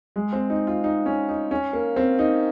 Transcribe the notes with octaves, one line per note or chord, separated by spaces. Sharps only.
G#3
C4
D#4
F4
D#4
C#4
D#4
C#4
A#3
C4
D#4